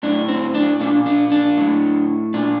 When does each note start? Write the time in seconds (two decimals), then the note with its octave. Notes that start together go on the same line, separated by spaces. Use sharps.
0.03 A2 D4
0.28 C4
0.54 D4
0.80 A#2 D4
1.06 D4
1.32 D4
1.57 A2
2.34 A#2 D4